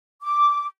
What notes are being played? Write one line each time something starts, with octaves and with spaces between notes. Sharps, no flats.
D6